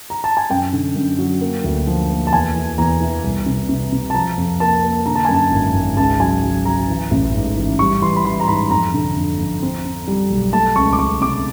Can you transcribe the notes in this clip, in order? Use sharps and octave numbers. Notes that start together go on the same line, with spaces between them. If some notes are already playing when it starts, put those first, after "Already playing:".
A#5
A5
G#5
F#2 G5
D3
F#2
F#3
A#3
D2
F3
A#3
A5
E2 G#5
E3
E2 A#5
E3
C2
C3
C3
C3
A5
F3 A#5
F2
A#3 A5
A#3
D3 A#5
A5
F#2 G#5
A5
G#1
G#1
C#2 A5
F#3 G#5
F#3
F#3 A#5
E3
A1
G#2
E3
G3 C#6
E3 C6
B5
E3 C6
A#5
G#2 B5
F2 A#5
D3
F2
F2
C4
C4
G3
B1
A3 A5
C#2 C#6
D6
C#2 C#6
C3 D6